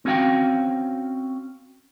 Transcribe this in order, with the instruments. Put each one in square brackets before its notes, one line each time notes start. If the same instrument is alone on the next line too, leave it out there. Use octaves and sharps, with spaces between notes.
[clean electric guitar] C4 C#4 F#4 F5 G5